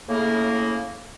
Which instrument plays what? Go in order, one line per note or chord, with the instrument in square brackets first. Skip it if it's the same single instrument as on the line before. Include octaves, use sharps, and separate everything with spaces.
[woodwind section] A2 C#3 A#3